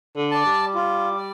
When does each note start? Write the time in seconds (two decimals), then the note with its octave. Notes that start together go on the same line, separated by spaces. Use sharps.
0.16 D3
0.31 D5 A5
0.46 G3
0.75 F4
1.17 D5